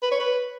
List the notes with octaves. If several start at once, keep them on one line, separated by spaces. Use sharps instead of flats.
B4
C#5
B4